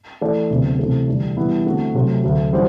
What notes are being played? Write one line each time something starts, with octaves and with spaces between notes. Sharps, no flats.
E3 A3 E4 A4 D5
D2 C3 F#3 B3
C3 E3 A3
E2 D3 G3 D4
E3 G3 B3 E4
D3 A3 C4 F#4
C3 F#3 A3 C4
D2 D3 F#3
E3 G3 F#4 C5